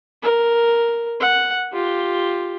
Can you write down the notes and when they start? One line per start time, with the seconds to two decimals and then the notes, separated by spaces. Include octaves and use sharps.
0.23 A#4
1.21 F#5
1.73 F4 G4